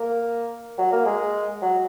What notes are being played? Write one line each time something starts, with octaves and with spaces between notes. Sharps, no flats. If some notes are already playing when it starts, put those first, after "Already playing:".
Already playing: A#3
F#3
A#3
G#3
F#3